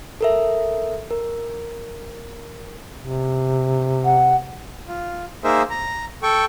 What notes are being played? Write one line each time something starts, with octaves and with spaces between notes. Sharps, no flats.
A4 A#4 E5
A#4
C3
F#5
F4
A#3 D#4 G#4 A#4 C5 E5
A#5
A4 G5 C#6